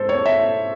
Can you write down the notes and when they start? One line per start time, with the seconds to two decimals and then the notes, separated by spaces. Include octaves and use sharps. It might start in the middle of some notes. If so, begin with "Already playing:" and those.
Already playing: G#2 A4 C5
0.09 C#5
0.26 E5